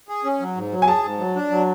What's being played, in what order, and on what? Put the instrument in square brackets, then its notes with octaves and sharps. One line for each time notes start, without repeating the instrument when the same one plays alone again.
[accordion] G#4
C#4
F#3
G#2
F#3
[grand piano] G#5
[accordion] G#4 [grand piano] A5
[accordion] G#2
F#3
D4
F#3